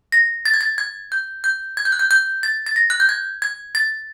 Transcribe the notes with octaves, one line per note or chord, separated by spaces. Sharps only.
A#6
A6
G#6
A6
G#6
G6
G6
G#6
G6
F#6
G6
G6
A6
A6
A#6
F#6
G6
G#6
G#6
A6